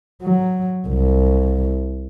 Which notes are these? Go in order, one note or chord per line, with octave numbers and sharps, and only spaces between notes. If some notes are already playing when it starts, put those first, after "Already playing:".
F#3
C2